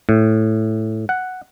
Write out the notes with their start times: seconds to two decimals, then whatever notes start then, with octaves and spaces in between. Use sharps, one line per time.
0.09 A2
1.09 F#5